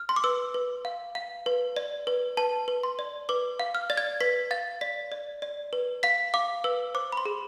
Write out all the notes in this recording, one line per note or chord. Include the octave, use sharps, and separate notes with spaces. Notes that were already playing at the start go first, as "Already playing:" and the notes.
Already playing: F6
C6
D6
B4 E6
B4
F5
F5
B4
D5
B4
B4 A5
B4
C6
D5
B4 D6
F5
F6
D5 A6
G#6
B4 B6
F5 A6
D5 B6
D5
D5
B4
F5 B6
F5 D6
B4 E6
C5 D6
B5
C6
G#4